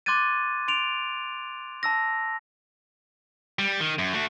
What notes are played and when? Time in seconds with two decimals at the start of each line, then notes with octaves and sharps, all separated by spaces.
0.06 C6 D6 F#6 G#6 A6 D#7
0.68 C6 D7 F7
1.83 A5 E6 A#6
3.59 G3
3.80 D#3
3.99 F#2
4.13 A3 F#4